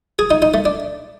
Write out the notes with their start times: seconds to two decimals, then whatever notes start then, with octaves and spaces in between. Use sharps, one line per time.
0.19 G#4
0.31 D#4
0.42 D#4
0.54 A3
0.65 D4